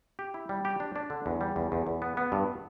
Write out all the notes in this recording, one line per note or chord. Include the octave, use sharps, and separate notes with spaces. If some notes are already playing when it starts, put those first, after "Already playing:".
G4
E4
G3
G4
D4
D4
D3
E2
G3
E2
E2
E2
B3
B3
G2